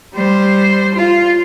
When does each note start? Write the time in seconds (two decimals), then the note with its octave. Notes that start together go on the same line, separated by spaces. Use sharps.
0.14 G3 C5
0.95 F4